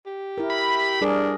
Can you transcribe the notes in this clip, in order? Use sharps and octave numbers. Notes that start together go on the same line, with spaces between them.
G4
E4 A#4
B5
G3 D4 G#4 A#4